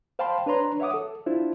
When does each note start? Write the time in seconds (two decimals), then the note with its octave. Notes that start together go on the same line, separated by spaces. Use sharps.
0.19 C5 F5 G5 A5 B5 C6
0.46 D4 B4 C#5 A#5 C6
0.80 C#5 E5 F#5 D6 D#6
0.94 A4
1.26 D4 E4 F4 C5